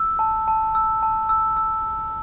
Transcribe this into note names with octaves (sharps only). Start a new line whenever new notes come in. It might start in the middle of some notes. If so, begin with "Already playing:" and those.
Already playing: E6
A5
A5
E6
A5
E6
E6